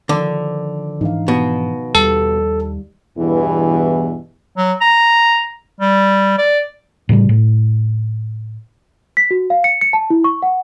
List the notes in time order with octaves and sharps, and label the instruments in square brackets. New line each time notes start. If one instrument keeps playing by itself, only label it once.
[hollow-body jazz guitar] D3 [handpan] D#3 F3
[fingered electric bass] G#2 E3 D4 [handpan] D#4 F5
[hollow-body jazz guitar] B2
[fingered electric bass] D#2 [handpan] G3 [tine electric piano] A4
[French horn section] E2 G2 B2 E3
[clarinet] F#3
A#5
G3
D5
[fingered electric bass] A2 C#3 F3 G3
A2
[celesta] B6
F#4
F5
C#7
C#7
A5
E4
C#6
F#5